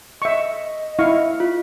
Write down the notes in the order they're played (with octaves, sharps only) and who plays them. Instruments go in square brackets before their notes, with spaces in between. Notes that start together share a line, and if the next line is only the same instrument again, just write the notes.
[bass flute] D#5 [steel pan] E5 C#6
[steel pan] E4 F5 C#6
[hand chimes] F4